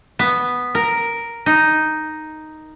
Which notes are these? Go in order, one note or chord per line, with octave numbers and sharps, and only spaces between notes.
B3
A#4
D#4